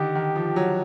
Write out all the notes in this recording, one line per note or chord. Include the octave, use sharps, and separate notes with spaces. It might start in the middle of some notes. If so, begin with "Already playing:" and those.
Already playing: D3 D#3 G4
D#3
F3
F#3